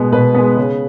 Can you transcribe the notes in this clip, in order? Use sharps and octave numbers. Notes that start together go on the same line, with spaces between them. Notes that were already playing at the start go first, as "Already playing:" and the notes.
Already playing: B2 G#3 B3
B2 B4
G#3 B3
C#3